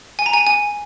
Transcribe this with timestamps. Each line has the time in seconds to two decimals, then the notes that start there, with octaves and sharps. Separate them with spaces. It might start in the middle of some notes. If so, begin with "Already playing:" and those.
0.19 G#5
0.26 A#5
0.33 G#5
0.47 G#5